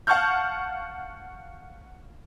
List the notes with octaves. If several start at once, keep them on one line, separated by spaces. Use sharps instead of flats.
F5 F#5 A5 C#6 F6 G6